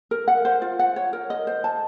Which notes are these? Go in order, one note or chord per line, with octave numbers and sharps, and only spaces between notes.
A#4
F#5
C5
F4
F#5
C#5
A#4
D#5
C5
A5